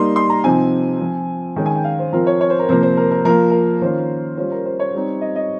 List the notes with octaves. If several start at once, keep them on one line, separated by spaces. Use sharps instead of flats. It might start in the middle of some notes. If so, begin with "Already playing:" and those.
Already playing: G3 A#3 D#4 C6
C6
A#5
C3 F3 C4 D#4 G#5
F3 C4 F4
D#3 G#3 C#4 G5
G#5
G5
F5
C5
F3 C4 F4 A#4
C#5
C#5
C5
A#4
C3 F3 A#3 C5
C5
A#4
A#4
F3 A#3 F4 A#4
A#4
D#3 A#3 C#4 F4 C5
G3 C#4 F4 C5
A#4
C5
C#5
G3 C4 D#4
D#5
D#5